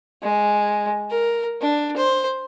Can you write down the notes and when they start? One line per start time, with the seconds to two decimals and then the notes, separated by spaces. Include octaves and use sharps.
0.23 G#3
1.11 A#4
1.62 D4
1.97 C5